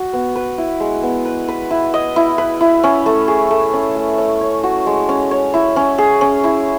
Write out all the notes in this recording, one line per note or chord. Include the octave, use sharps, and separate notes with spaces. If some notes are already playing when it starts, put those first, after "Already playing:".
Already playing: F#4
B3
B4
E4
G#3
B3
B4
B4
E4
D#5
E4
B4
E4
C#4
A3
G#4
A3
C#4
A3
C#4
C#5
F#4
G#3
C#4
C#5
E4
C#4
G#4
C#4
E4